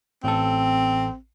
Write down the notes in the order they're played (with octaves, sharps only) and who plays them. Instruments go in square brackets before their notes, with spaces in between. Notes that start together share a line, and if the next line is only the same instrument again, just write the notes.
[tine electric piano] A1 A4 [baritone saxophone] C4